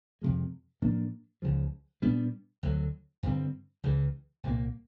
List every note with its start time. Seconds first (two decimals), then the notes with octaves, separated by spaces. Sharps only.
0.22 F2 C3 F3 G#3
0.82 A2 F3 A#3 D4
1.42 C#2 C#3 F3
2.02 A#2 G3 B3 D4
2.63 D2 D3 F#3
3.23 G2 D3 G3 C4
3.83 C#2 C#3 E3
4.43 C2 A#2 G3 A#3